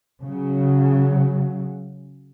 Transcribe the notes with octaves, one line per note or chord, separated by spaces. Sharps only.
C#3 F#3